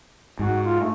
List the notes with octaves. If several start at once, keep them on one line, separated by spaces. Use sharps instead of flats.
G#2 F#4
F4
A3